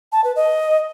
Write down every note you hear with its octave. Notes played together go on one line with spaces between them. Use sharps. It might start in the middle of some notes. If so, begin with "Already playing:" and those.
A5
B4
D#5